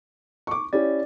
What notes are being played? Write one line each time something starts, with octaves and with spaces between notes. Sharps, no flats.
C#6 D6
C#4 E4 G4 D5